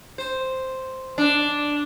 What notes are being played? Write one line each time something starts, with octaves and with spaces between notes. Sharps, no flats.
C5
D4